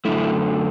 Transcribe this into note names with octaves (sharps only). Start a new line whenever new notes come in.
F#2 D3 A3 E4